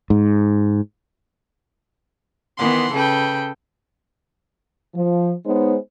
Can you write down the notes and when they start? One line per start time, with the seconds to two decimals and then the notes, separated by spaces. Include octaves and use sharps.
0.10 G#2
2.58 D#3 E3 B3 F#5 C6
2.93 C#3 A4 B4 G5 G6
4.95 F3
5.45 G#3 B3 D#4 C5 C#5